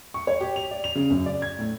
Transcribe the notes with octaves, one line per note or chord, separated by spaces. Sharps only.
C#6
C#5
G4
F7
D5
F7
C#3
F#2
D5
G#6
A2